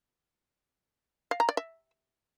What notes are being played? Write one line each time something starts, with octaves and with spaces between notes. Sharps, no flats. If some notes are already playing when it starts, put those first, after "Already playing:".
F5
A#5
D5
E5